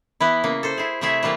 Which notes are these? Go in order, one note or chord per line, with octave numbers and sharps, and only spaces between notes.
E3 B3 E4
C#3 A#3
A4 C5
E4 G#4
C3 A3 E4 G#4 E5
E3 G3 A#3 F4